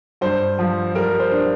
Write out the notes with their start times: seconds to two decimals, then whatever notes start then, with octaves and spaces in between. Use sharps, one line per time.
0.21 G2 C5
0.59 F3
0.95 G3 A#4
1.19 C5
1.32 D4